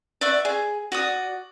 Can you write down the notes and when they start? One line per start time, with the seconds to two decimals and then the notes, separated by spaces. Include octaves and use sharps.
0.21 D5 E5 F#5 C#6
0.45 G#4
0.92 F#4 D5 D#6